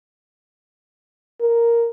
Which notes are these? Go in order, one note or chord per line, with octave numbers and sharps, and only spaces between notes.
A#4